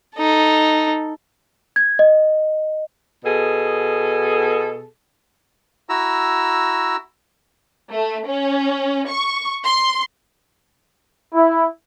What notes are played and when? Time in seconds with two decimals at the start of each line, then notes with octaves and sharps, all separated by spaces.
0.16 D#4 A4
1.76 G#6
1.99 D#5
3.24 B2 G#4 A4
5.89 E4 F#4 A#5 E6
7.92 A3
8.27 C#4
9.09 C#6
9.64 C6
11.33 E4